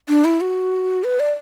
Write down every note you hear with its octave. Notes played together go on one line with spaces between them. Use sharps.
D4
E4
F#4
B4
D5